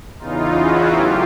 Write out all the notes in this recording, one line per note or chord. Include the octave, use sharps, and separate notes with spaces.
E2 C#3 E3 D#4 F4
E4 F#4
A2 F#3 F4 G4